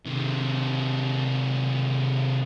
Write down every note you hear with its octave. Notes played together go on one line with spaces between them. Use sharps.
C3 D#3